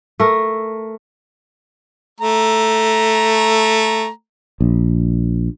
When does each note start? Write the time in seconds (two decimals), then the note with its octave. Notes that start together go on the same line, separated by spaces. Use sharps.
0.20 A3 A#4
2.20 A3 A#5
4.61 A#1